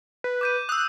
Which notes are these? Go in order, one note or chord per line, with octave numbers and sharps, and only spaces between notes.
B4
D6 G6 D#7
D#6 E6 F#6